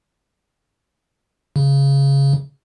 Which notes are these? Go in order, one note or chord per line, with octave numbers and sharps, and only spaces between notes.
C#3